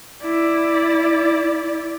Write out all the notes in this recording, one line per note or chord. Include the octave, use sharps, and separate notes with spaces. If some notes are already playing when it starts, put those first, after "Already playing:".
E4 D5